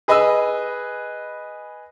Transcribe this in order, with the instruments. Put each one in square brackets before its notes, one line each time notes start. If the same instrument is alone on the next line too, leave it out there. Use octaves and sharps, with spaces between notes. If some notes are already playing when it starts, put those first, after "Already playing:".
[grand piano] G#4 B4 D#5 G#5 B5 E6